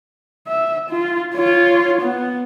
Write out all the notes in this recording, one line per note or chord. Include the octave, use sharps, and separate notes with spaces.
E5
F4
F4 C#5
B3